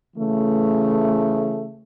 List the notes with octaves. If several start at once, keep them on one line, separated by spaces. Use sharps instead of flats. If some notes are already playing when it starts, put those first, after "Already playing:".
C#3 E3 A3